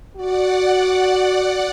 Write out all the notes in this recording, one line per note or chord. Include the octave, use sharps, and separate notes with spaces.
F#4 D5 F#5